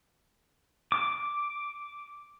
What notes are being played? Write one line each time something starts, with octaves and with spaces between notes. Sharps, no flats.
D6